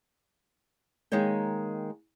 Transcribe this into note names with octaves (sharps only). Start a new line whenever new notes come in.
D#3 G#3 A#3 C#5 G5